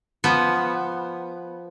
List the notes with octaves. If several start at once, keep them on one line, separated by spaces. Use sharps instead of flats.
F3 B3